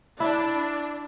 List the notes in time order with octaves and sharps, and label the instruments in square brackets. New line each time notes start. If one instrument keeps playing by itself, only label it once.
[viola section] D4 [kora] E4